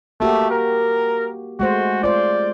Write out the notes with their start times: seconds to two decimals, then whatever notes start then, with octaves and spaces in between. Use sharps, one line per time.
0.20 A3 A#3 F#4 G4
0.51 A#4
1.60 G#3 A3 F#4 C5
2.03 F4 C5 D5